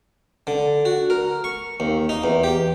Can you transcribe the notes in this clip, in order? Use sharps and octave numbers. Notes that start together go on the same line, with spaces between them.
D3
F#4
A#4
C#6
D#2
D#4
E2
G4